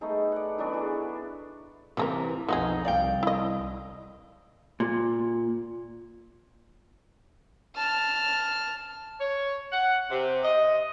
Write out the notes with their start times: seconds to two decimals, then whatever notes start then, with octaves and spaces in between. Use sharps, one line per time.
0.01 A3 B3 D#4 G#4
0.32 D5 F#5
0.58 E3 F#3 B3 D4
0.73 E4 F#4 G#4
1.97 C3 E3 G3 G#4 A#4
2.48 B1 F2 B3 D#4 F#4 G#4
2.85 C2 D5 F5 G5
3.23 E4 D#5
4.80 A#2
7.77 A5 F6
9.20 C#5
9.72 F#5
10.11 C3
10.44 D#5